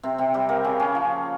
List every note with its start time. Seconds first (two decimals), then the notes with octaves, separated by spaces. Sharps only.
0.03 C3 C4
0.18 C3 C4
0.34 G3 G4
0.49 A#3 A#4
0.64 C#3 C#4
0.80 C#3 C#4
0.95 F3